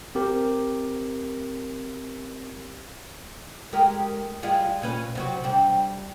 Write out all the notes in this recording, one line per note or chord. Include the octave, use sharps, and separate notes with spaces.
C4 G4 A#4
G#3 G4 A#4
G3 G#3 F4
A#2 C#4 B4
C3 F#3 F#4
G3 D4